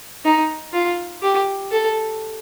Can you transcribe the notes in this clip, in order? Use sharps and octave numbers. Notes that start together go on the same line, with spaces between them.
D#4
F4
G4
A4